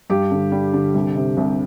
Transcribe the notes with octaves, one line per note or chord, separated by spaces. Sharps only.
G2 G4
D3
G3
D3
C2
C3
C2